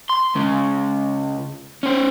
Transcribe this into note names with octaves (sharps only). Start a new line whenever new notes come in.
C6
C#2 C#3
C#4 C5